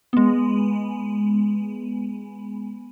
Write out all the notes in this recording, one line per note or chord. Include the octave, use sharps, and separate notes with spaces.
G#3 B3